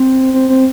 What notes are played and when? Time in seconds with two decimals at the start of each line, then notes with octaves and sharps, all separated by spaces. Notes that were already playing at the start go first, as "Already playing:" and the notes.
Already playing: C4
0.34 C4
0.49 C4